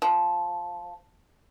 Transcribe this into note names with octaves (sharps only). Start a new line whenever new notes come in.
F3